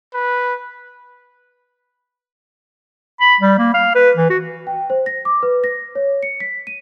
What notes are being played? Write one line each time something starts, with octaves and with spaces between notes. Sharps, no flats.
B4
B5
G3
A#3
F5
B4
E3
F#4
G5
C5
A#6
D6
B4
A#6
C#5
C#7
B6
D#7